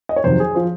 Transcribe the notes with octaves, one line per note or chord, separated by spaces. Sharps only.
D#5
C#5
F2 C3 D#3 F#3 C5
G#4
F3 C5